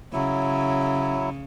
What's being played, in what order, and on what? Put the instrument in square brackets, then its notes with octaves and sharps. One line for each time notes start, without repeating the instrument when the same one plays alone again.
[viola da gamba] C#3 [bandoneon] F#3 E4